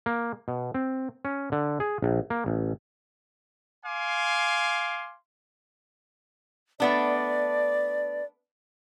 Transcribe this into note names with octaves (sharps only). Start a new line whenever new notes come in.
A#3
B2
C4
C#4
D3
G#4
A#1
A#3
A1
F5 G#5 C6 D6
A3 B3 D4 D5